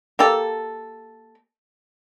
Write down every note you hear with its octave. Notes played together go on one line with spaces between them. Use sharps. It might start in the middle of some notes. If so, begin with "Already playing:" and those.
A#3 G4 A4